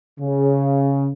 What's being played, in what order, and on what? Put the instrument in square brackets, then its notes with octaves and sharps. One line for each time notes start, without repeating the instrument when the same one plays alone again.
[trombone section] C#3